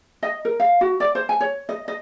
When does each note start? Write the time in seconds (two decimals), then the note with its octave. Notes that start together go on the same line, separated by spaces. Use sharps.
0.23 D#5
0.45 A#4
0.60 F5
0.81 F#4
1.00 D5
1.15 C5
1.29 G#5
1.41 C#5
1.69 D#5
1.88 D#5